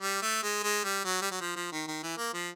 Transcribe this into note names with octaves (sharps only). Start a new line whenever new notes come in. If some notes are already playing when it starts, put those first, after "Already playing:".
G3
A3
G#3
G#3
G3
F#3
G3
F#3
F3
F3
D#3
D#3
E3
A#3
F3